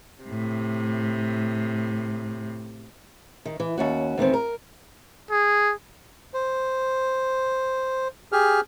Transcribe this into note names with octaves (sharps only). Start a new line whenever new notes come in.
A2 C3
D#3
E3
D#2 C#4 F#4
E2 D#3 B3 C4
A#4
G#4
C5
G4 G#4 F6